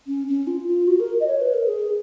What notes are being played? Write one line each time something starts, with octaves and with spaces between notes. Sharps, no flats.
C#4
C#4
F4
F4
F#4
A#4
D#5
C#5
B4
A#4
G#4